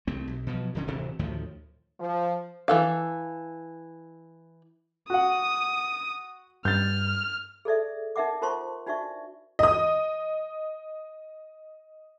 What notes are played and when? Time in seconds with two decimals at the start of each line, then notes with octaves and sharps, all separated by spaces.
0.07 C2 A3 C4
0.27 B1
0.47 B2 F3 F#3
0.75 D1 D3 C#4
0.87 D1 C3 E3
1.19 D2 A2 D#3 F3
2.00 F3
2.68 E3 A4 F5
5.10 F#4 F#5 D#6
6.65 G2 F6 G6 A6
7.65 G#4 A4 D5 E5
8.16 D#4 A#4 E5 F#5 D6
8.42 F4 A#4 C5 A5 C6 C#6
8.86 D4 D#4 F#4 D5 E5 C#6
9.59 D#5 D#6